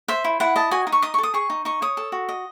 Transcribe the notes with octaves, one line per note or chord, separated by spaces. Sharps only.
C5 E5
E4
E4 F#5
D#5 A5
F#4 G#5
D#4
C#6
D#4 D#6
C#6
A4 D#6
G#4 C#6
D#4
D#4 C#6
C#5 D#6
A4
F#4
D#5